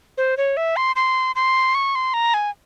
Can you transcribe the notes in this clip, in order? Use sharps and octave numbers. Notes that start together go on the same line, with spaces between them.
C5
C#5
E5
C6
C6
C6
C#6
C6
A#5
G#5